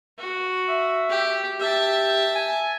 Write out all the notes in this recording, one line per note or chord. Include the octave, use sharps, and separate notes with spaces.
F#4
E5
G4
G4 E5 A5
G#5